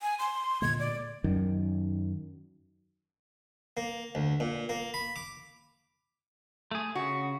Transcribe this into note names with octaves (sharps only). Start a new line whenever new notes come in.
G#5
C6
A#2 D3 G#3 G#6
D5
F#2 D#3
A#3
D2
A#2
A#3
B5
D6
A3 G#4
C#3 F#4